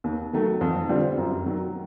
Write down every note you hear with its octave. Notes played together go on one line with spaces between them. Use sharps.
D#2
D#3 F#3 A3
F2
D3 G3 C4 F4
F#2
D#3 F#3